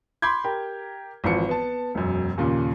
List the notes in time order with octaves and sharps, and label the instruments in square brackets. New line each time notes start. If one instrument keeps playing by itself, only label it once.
[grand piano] B5 C6 D6 G6 G#6
G4 A#4
G#1 E3 F3 C#7
B3 A5
E1 F#2
D#2 A#2 C#3